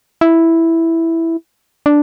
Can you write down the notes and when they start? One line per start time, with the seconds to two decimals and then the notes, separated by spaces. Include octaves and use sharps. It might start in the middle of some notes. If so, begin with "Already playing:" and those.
0.21 E4
1.86 D4